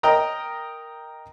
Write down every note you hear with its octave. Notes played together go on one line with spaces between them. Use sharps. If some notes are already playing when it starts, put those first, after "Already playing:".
A#4 D#5 G5 A#5 D#6